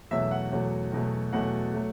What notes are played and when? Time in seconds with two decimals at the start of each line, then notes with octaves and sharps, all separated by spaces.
0.11 E2 B2 F#3 A3 E5
0.31 F#5
0.52 E2 B2 F#3 A3
0.92 E2 B2 F#3 A3
1.33 E2 B2 F#3 A3 F#5
1.74 F#3 A3